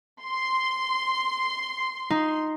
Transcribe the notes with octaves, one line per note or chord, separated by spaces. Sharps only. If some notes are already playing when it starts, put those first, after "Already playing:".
C6
D#4